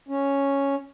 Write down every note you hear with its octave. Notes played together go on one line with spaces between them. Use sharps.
C#4